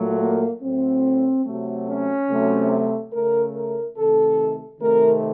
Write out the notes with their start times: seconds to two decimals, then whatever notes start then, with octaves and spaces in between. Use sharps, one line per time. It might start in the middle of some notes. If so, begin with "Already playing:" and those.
Already playing: A#2 F#3 A3
0.20 A#3
0.62 A2 F#3 A3 C4
1.46 C3 F#3 A3
1.88 C#4
2.30 C3 F#3 A3
3.13 C#3 A3 A#4
3.55 A#4
3.97 C3 D#3 A3 A4
4.80 C3 D#3 A3 A#4